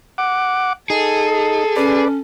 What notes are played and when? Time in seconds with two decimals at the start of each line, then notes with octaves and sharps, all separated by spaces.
0.18 F#5 D6
0.90 D#4 G#4 A4
1.76 C#4 B4 D5